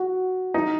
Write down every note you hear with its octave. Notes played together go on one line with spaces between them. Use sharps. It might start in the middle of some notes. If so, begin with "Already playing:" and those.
Already playing: F#4
D#4